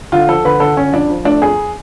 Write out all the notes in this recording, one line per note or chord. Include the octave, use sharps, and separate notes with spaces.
D3 F4
F3 A4
D3 B4
D3 A4
D3 C#4
F2 D4
F3
A3 D4
F2 G#4